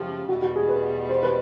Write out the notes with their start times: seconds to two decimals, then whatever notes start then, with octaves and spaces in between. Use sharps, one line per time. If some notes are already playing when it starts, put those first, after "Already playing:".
Already playing: F#2 C#3 F3 A3 C#4 G4
0.28 E2 B2 G3 F#4
0.42 F#4
0.56 G#4
0.69 B4
1.09 C5
1.23 B4